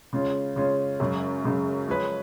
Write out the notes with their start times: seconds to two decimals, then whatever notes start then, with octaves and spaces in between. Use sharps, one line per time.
0.13 C#3 G#3 C#4 F4
0.56 C#3 G#3 C#4 F4
1.00 F#2 C#3 G#3
1.44 F#2 C#3 G#3
1.88 F3 G#3 C#4 G#4 B4